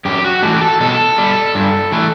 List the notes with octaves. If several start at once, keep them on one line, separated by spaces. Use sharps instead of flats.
F#2 G4
F#4
E3 A3 G4
A4
B2 A4
G3
G2
E3 A3